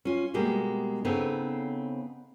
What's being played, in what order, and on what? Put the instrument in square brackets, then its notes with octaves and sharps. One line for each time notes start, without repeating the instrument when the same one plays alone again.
[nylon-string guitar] C#4 F4
B2 G3 G#3 A#3
C#3 B3 C4 D#4 A4 C#5